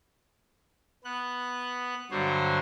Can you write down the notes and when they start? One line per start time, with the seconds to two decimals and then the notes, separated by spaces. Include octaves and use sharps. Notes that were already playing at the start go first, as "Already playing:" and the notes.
1.04 B3 F#6
2.11 G2 D3 F#3 C5 C#5